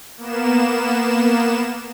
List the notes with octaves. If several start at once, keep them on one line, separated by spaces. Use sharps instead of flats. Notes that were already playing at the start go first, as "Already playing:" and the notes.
A#3 B3 E7